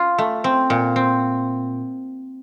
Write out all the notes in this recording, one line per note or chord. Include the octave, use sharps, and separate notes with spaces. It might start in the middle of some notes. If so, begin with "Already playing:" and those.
Already playing: F4
A3
C4
A#2
C4